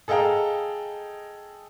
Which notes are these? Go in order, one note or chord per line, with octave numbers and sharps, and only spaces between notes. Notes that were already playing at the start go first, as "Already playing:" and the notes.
G#4 A4 D#5 F5 G5 A#5